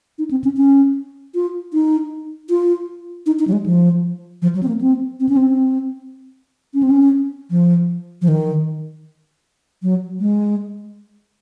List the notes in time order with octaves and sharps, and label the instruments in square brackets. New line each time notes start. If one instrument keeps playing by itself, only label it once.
[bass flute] D#4
C4
C#4
C#4
F4
D#4
F4
D#4
D#4
F#3
G#3
F3
F3
F#3
C4
A#3
C4
C4
C#4
C4
C#4
C4
C#4
F3
F3
D#3
F#3
G#3